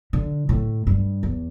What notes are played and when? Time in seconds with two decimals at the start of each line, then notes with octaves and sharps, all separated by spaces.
0.13 D3
0.49 A2
0.87 G2
1.23 E2